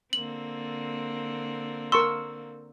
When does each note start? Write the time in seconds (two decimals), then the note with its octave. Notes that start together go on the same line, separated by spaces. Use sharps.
0.13 D3 A#3 C4 F#7
1.92 A#4 C6 C#6 E6